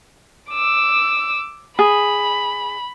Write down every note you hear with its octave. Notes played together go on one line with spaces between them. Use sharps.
D6 E6
G#4 B5